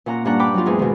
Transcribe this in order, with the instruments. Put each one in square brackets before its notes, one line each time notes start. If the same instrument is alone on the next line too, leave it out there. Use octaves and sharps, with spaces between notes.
[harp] A#2 C#4 F#5 A#5
G2 A#3 C#4 D4 F#5 A#5
G5 B5 D6
F#3 D#4 F4
E2 G#2 G#4
B2 D#3